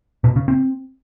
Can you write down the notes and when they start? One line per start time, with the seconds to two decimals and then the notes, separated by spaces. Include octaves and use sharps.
0.24 B2
0.36 C#3
0.48 C4